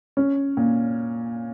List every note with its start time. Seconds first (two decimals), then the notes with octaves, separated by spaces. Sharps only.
0.17 C#4
0.57 A#2